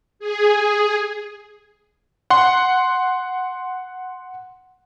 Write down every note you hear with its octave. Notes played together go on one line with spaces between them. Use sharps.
G#4
F#5 C6